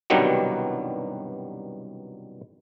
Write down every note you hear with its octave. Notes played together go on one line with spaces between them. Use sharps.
C2 G2 B2 D#3 F#3 G3